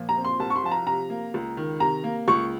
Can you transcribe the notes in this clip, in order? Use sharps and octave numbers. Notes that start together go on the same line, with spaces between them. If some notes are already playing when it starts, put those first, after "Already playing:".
Already playing: A#2 F3
A#5
C4
C6
C2 A5
C#6
C6
F3 A5
A#5
C3 A#5
A#3
C#2
D#3
C3 A#5
A#3
C#2 C#6